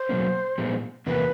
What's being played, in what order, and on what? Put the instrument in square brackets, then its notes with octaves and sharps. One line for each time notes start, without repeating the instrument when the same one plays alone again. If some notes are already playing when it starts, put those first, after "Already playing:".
Already playing: [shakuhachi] C5
[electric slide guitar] B2 F#3 A#3 C#4
A#2 F3 G#3 B3
[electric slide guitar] E2 C3 F3 A#3 [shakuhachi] B4